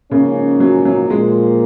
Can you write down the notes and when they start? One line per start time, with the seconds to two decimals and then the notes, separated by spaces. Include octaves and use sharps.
0.11 G#2 C#3 F3 A#3 C#4
0.60 F#3
0.85 F#3
1.10 A#2 F3 G#3 A#3 F4